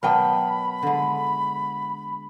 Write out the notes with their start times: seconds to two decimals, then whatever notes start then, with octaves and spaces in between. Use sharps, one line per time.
0.03 B2 F#3 A#4 D#5 G5 A5 B5
0.82 D3 G#3